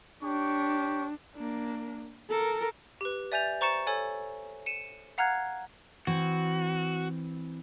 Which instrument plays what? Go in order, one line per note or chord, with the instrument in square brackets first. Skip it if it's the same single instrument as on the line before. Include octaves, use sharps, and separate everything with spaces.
[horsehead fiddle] D4 [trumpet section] G4 C#5 C#6
[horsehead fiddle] A#3 D4
A4 A#4
[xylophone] G4 B4
D5 E5 G#5 G6 A6 F7
C5 A#5 C#6 A6 C#7 E7
A4 C#5 G#5 A6
C#7 D#7 E7
F5 F#5 A#5 F6 F#6 G#6
[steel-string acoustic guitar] E3 C4 [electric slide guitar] F#4